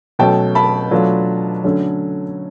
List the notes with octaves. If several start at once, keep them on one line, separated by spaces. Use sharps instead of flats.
B2 F#3 A3 C#4 G5 A5
A5 B5
B2 F#3 A3 D4 F4
D3 F#3 A3 C#4